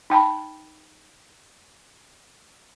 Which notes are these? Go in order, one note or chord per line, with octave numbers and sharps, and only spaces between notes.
D#4 G5 A5 B5